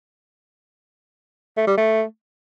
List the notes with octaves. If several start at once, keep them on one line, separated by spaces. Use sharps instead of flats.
A3
G3
A3